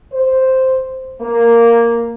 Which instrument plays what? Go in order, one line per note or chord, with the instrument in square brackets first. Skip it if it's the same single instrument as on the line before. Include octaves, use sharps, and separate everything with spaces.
[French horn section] C5
A#3